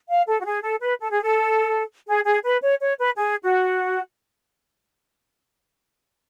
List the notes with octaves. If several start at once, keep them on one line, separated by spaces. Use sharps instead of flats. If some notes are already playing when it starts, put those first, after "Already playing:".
F5
A4
F#4
G#4
A4
B4
A4
G#4
A4
G#4
G#4
B4
C#5
C#5
B4
G#4
F#4